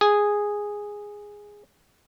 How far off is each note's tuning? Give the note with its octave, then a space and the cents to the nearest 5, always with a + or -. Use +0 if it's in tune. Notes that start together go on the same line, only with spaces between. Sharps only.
G#4 -5